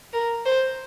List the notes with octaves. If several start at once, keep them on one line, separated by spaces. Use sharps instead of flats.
A#4
C5